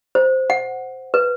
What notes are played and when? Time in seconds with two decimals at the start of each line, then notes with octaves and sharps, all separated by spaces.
0.15 C5
0.50 F#5
1.14 B4